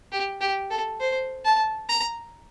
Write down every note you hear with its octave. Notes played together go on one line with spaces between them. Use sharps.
G4
G4
A4
C5
A5
A#5